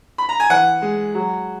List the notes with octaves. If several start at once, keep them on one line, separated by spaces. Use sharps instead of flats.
B5
A#5
G#5
E3 F#5
G#3
F#3